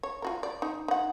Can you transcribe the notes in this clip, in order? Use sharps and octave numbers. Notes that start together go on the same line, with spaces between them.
C#5
F4 F#4 A#4
D5
D#4
D#4 F#5